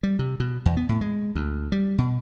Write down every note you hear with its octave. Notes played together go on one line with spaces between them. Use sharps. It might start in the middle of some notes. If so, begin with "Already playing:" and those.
G3
C3
B2
E2
B3
A2
G#3
D2
G3
B2